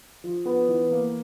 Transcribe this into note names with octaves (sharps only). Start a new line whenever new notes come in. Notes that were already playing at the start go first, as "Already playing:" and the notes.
F3
B3
E3
A#3